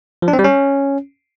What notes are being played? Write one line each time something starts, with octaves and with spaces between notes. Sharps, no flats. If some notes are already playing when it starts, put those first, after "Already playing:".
F3
D4
C4
G3
C#4